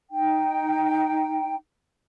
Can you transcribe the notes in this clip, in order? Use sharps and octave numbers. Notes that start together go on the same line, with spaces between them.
D#4 G5